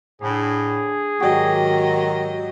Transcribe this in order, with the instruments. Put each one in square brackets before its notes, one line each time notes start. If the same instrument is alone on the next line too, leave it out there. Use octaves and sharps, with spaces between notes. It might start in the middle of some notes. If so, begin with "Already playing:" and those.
[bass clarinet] A2 [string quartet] D3 [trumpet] G#4
[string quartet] G#2 F#3 D#5 [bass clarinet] D#3 [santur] F#4 G4